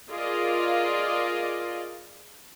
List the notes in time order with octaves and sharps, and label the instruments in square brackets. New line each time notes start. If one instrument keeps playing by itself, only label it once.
[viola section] F4 G#4 A#4 D5 D#5 F5